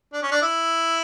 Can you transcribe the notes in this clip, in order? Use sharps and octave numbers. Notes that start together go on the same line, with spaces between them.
D4
C#4
D4
E4